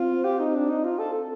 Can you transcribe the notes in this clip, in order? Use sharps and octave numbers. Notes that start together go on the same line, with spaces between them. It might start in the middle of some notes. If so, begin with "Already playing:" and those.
Already playing: C4 F4 C5
G4
D#4
D4
D#4
F4
A4
A4